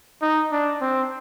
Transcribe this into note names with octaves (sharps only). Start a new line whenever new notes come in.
D#4
D4
C4